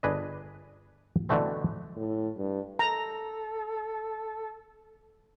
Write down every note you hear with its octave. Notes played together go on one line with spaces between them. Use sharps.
G1 D4 G#4 B4 D5 D#5
B2 D3 E3 A3 C4
A2
G2
A4 A#5